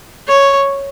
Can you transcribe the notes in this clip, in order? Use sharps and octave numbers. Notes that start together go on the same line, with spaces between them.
C#5